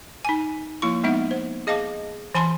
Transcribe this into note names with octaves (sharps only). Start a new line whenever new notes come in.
D#4 G#5
F3 A#3 E4 C#6
G#3 B3 D#4 E5 F#5
C5
G#4 D#5 F5 A5 D6
E3 G#5 A5 B5 C6